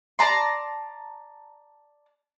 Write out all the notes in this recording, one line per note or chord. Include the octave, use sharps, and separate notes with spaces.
D5 A5 A#5 C6